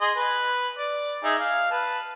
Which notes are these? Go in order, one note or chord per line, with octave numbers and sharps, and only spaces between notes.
G#4 D#5 C6
B4
D5
D#4 G#4 E5
F5
B4 A5